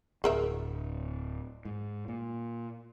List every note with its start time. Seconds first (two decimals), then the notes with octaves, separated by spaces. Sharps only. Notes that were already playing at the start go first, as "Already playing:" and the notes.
0.24 D1 G#1 G#4 A#4 E5
1.65 G#2
2.08 A#2